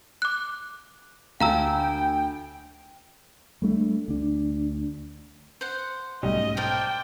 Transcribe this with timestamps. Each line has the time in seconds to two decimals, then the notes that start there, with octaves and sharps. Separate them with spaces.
0.22 D6 F#6
1.40 D2 D4 F5 G5 A5 A#5 E6
3.62 G3 A3 C4 D4
4.08 D2 D4
5.61 C5 F#5
6.23 B1 G#2 G3 A3 C#4 D#5
6.57 A#4 C5 D5 G5 A5